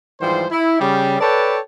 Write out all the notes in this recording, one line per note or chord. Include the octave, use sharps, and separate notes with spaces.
G#2 E3 F3 G3 C5
E4
C#3 G3
A4 B4 C#5 D5 G5 A5